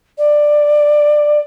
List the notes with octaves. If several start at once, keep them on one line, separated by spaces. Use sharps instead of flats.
D5